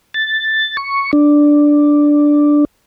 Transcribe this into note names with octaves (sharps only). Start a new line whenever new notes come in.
A6
C#6
D4